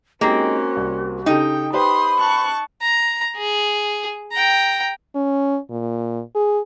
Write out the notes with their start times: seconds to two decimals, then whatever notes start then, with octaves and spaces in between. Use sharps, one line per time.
0.21 G#3 A#3 C4 C#4 D#4 F#4 G4
0.77 C2
1.26 C#3 D#4 G4 A4 G5
1.73 G4 B4 C5 B5 C6 D#6
2.19 A5 C#6 F#6
2.82 A#5
3.37 G#4
4.33 G5 A#5
5.15 C#4
5.70 A#2
6.35 G#4